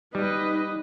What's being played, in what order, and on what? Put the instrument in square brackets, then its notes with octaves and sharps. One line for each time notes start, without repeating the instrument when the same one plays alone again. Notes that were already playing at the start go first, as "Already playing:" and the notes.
[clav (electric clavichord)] G3 [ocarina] D#4 [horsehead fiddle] B4 D#5